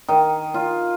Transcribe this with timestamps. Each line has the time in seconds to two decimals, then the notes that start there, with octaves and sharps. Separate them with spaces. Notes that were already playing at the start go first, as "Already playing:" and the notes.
0.08 D#3
0.54 F4